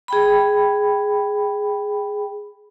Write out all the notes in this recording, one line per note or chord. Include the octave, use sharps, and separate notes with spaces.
G#4 G5 B5